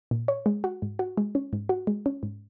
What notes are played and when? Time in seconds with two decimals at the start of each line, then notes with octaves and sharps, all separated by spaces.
0.11 A#2
0.28 C#5
0.46 G#3
0.64 F#4
0.82 G#2
0.99 F#4
1.18 G#3
1.35 C#4
1.53 G#2
1.69 F#4
1.87 G#3
2.06 C#4
2.23 G#2